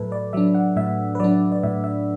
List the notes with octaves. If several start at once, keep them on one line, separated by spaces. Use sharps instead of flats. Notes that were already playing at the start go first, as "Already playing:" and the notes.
Already playing: A2 F#3 A4 B4 E5
D5
F#3 D4 E5
F#5
A2 E5
B4
F#3 D4 D5
D5
A2 E5
E5